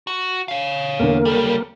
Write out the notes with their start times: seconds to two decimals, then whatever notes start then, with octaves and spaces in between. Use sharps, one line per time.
0.07 F#4
0.48 C#5 F5
0.99 E2 D3 A#3 A#4
1.25 C#3 G3 A4